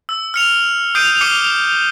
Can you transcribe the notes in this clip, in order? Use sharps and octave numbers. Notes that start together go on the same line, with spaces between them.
E6
F6 C#7 F7
D#6 G6 C7 D7 D#7
D6 F6 C7 C#7 D#7 G7